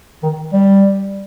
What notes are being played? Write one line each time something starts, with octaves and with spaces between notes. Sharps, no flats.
D#3
G3